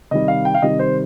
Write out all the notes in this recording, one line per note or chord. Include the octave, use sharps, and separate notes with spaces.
C3 D#3 G3 D#5
F5
G5
F5
C3 D#3 G3 D#5
C5